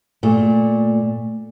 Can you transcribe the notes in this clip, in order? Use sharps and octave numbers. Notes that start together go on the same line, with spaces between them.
A#2 A3